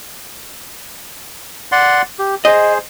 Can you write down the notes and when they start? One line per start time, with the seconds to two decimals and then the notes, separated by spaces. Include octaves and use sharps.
1.72 D5 F#5 C6
2.19 G4
2.45 G#4 C5 D#5